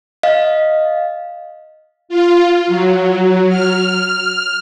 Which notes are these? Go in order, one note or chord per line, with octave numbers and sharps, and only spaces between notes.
D#5 F5
F4
F#3
F6